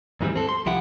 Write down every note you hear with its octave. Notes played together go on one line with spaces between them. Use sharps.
D#2 G#2 E3 F3 G3 C4
C4 A4
C6
C2 F3 E4 G4 F#5